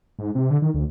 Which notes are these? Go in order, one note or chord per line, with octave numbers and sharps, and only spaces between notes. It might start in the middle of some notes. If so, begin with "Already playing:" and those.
G#2
C3
D3
D#3
D2